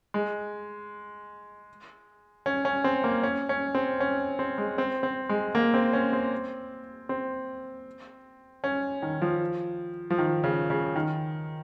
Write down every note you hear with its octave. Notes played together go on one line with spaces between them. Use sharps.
G#3
C#4
C#4
C4
A#3
C#4
C#4
C4
C#4
C4
G#3
C4
C4
G#3
A#3
C4
C#4
C4
C4
C#4
D#3
F3
F3
D#3
C#3
C#3
D#3